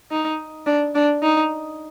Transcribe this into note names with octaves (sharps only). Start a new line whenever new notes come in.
D#4
D4
D4
D#4